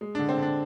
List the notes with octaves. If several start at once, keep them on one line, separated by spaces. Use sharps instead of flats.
G#3
D4
D3
C4
D3
D4